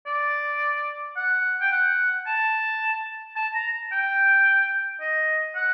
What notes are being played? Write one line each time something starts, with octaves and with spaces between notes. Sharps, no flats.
D5
F#5
G5
F#5
A5
A5
A#5
G5
D#5
F#5